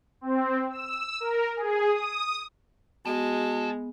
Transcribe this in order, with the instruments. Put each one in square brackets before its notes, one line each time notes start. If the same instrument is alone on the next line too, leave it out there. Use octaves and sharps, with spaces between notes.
[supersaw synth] C4
E6
A#4
G#4
D#6
[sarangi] G#3 [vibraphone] B3 [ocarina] F#4 [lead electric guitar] A4